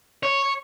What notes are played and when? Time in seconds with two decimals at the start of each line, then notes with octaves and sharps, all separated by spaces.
0.23 C#5